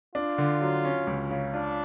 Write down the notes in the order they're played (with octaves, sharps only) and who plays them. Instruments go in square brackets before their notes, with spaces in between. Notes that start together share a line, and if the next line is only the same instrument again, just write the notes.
[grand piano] D4 [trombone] F4
[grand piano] D3
F#3
C#4
C#2
C#3
[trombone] D4 [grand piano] F4